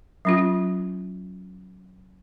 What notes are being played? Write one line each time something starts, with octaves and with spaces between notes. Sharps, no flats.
F#3 C#4 F4